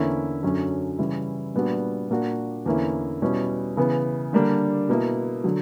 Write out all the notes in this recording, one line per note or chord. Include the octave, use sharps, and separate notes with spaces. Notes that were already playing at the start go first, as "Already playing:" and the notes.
Already playing: E2 D3 A#3 C#4 E4
F#2 D3 F#3 C#4
C#3 E3 G3 C#4 E4
A#2 G3 B3 D4 F#4
A#2 A#3 D4 F#4
E2 D3 A#3 C#4 E4
B2 G3 C#4 E4
C#3 E3 B3
D3 G3 A#3 D4
B2 A#3 E4
D3 F#3